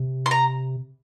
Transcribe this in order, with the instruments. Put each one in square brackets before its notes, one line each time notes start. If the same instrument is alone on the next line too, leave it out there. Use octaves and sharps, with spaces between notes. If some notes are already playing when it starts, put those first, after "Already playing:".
Already playing: [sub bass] C3
[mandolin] C6
A#5